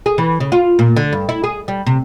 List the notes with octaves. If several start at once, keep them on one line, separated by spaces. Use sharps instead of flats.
G#4
E3
C#3
F4
A#2
D3
G2
E4
G#4
G3
C3